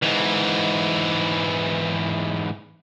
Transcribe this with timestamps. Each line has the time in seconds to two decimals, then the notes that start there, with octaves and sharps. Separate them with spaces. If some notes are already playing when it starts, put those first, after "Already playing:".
0.03 G#2 E3